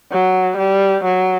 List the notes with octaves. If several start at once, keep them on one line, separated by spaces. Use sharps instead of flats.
F#3
G3
F#3